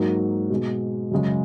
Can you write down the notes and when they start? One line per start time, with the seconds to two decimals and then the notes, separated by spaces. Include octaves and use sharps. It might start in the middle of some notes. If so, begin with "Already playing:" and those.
Already playing: G#2 F#3 A#3
0.50 B2 G#3
1.11 F#2 C#3 G#3